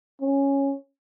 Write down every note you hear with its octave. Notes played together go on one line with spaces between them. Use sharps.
C#4